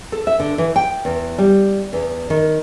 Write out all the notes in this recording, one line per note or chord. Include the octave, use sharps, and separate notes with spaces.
A4
E5
D3
E3
G5
E2
G3
E2
D#3